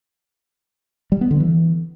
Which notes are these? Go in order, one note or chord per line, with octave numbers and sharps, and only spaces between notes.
G3
B3
D3
E3